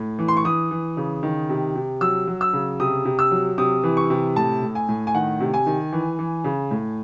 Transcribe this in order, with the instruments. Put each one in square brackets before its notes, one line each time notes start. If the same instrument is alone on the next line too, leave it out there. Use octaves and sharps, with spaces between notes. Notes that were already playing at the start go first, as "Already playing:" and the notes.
Already playing: [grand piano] A2
E3
C6
C#6
E3 D#6
E3
C#3
D#3
C3
C3
F#3 E6
F#3
E6
C#3
C3 D#6
C3
E6
F#3
C3 D#6
E3
C#6
C3
A2 A5
A2
G#5
A2
G#5
D#3 F#5
C3
G#5
D#3
E3
E3
C#3
A2